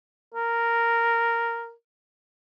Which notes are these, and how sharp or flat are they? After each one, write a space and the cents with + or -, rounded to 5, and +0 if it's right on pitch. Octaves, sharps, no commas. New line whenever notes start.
A#4 -5